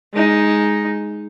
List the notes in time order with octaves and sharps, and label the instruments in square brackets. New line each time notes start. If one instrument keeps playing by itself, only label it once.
[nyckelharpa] G#3 D#4